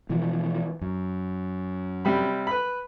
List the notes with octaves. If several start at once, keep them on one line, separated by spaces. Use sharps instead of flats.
B2 E3 F3
F#2
C3 G3 B5
B4 B5